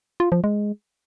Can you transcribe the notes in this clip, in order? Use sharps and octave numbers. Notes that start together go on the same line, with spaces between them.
F4
F3
G#3